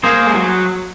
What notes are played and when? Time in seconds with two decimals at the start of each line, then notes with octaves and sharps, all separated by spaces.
0.03 A#3 G#4 C5
0.26 G#3
0.35 F#3